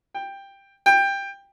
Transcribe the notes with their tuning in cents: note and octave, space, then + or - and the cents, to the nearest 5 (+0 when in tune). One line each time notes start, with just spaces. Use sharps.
G5 +10
G5 +15